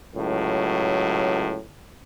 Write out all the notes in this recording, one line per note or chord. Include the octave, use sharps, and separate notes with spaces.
C#2 A2 F#3